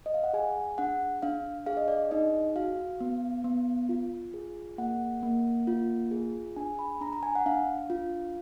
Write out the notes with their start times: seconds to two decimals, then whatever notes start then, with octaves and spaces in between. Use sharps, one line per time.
0.06 D#5
0.14 F5
0.24 F#5
0.33 G#4 G#5
0.78 D4 F#5
1.22 D4 F5
1.66 G#4 F5
1.77 D#5
1.88 D5
1.98 D#5
2.11 D#4 D#5
2.56 F#4 F5
3.00 B3
3.44 B3
3.89 F4
4.34 G#4
4.78 A#3 F#5
5.23 A#3
5.67 F4
6.11 G#4
6.56 D4 G#5
6.79 B5
7.01 D4 A#5
7.13 A#5
7.23 G#5
7.35 F#5
7.46 D4 F5
7.90 F4